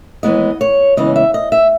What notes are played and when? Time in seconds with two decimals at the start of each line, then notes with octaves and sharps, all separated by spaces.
0.23 D#2 C#3 E3 G#3 B3 D#5
0.61 C#5
0.97 D#2 C#3 E3 G#3 B3 D#5
1.16 E5
1.34 D#5
1.52 E5